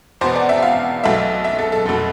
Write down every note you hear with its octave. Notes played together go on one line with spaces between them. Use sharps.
E2 B2 B3 C5
D5
E5
F5
B1 B2 A3 E5
E5
A4
A4
F1 B2 A3